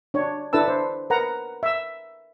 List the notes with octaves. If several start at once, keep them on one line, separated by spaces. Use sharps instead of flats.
D4 C#5
D4 E4 A4 B4 A5 E6
C5
A#4 B4 F#5 A#5
E5 E6